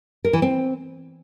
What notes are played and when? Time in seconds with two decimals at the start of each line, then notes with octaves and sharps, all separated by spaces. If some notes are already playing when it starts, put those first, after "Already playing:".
0.25 A#4
0.33 E3
0.42 C4